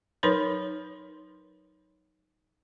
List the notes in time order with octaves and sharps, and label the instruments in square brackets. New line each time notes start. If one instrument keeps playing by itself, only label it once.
[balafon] F#3 D#4 A#4 B4 C#5 C6